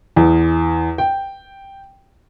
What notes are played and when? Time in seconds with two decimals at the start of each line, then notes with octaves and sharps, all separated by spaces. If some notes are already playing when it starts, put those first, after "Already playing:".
0.16 E2
0.98 G5